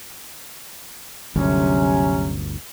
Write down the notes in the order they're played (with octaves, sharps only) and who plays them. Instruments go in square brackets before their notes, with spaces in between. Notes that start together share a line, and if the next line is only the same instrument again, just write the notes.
[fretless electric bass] G1 D2 [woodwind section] C3 F#3 C#4